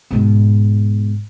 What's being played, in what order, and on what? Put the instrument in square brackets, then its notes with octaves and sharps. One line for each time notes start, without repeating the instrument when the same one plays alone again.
[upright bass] G#2 B2